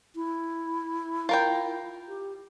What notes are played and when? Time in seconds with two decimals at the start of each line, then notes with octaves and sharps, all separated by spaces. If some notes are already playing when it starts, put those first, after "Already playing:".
0.15 E4
1.29 F4 A#4 G5
2.08 G4